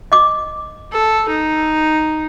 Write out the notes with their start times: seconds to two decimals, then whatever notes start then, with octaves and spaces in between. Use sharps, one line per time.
0.12 D#5 D6
0.92 A4
1.29 D#4